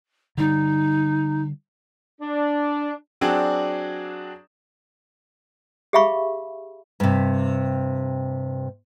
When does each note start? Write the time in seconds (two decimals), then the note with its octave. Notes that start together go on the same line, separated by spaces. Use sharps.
0.38 D3 G3 D#4
2.21 D4
3.21 F#3 C4 D4 F#4 G#4 D5
5.93 G4 G#4 E5 F5 B5 C#6
7.00 G2 C3